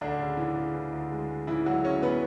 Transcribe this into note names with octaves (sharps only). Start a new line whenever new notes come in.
D2 D3 D4
C#3
E3
C#3
E3
D2
G#3
G#3
C#3 E3 E4
F#3 G#3 F#4
G#3 C#4 C#5
C#3 B3 B4